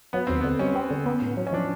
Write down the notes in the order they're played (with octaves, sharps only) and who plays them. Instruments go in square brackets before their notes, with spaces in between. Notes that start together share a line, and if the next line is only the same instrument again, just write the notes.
[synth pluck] F#3 [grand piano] B3
[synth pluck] D#2 [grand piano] C4
[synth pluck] D3 [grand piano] B3
[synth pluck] G3 [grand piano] C#4
[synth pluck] C4
D3
B3
A2
F#3
[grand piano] C#4
[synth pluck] F3 [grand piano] D4